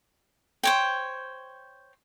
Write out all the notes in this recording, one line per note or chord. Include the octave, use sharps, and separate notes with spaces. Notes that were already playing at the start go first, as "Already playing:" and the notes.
C5 C#5 G5